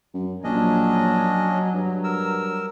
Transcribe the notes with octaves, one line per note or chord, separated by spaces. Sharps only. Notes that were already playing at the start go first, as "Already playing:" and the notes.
F#2
A#1 F#3 C#4 D4 D#5
G2
A#4 E6